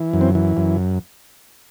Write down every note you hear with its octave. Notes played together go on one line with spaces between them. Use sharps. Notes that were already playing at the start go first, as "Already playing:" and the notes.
Already playing: E3
F#2
C4
E3
F#2